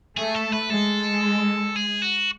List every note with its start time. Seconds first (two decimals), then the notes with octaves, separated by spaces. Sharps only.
0.17 A3 G#4
0.35 A4
0.52 B4
0.70 G#3 A4
1.76 G#4
2.02 F#4